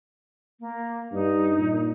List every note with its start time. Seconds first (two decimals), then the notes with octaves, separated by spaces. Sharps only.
0.60 A#3
1.13 G2 D#4
1.58 A#2